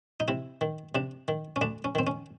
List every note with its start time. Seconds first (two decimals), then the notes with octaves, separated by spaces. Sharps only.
0.20 D#4
0.28 C3 E4
0.61 D#3
0.95 C3 D4
1.28 D#3
1.56 C#4
1.61 D2 D4
1.84 C#4
1.95 D#3 C4
2.07 C#4